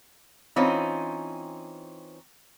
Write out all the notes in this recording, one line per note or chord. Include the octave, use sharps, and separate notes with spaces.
E3 C4 C#4 D#4 F4